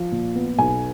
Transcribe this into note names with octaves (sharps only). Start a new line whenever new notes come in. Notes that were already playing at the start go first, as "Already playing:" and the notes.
Already playing: F3
A#2
B3
B1 G#5